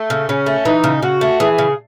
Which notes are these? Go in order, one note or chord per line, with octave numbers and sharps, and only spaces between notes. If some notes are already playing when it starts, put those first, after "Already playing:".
Already playing: A3
C#3
C#3 C#4
A3
E3 D#4
C#3
C#3 F#4
A3
E3 G#4
C#3